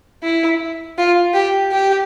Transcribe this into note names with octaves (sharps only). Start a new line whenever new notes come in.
E4
F4
G4
G4